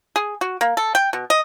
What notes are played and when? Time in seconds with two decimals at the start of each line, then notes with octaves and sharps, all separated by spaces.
0.16 G#4
0.41 F#4
0.61 A#3
0.77 A4
0.95 G5
1.13 B2
1.30 D#5